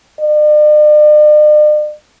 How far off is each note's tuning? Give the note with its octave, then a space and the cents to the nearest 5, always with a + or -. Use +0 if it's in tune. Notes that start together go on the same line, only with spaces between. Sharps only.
D5 +45